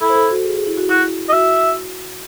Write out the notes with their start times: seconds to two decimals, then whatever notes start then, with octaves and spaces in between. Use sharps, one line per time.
0.01 E4 A4
0.09 C5
0.15 A4
0.31 F#4
0.45 G#4
0.56 G#4
0.67 E4
0.77 F#4
0.89 E4 F#4
1.29 D#5
1.33 F#4 E5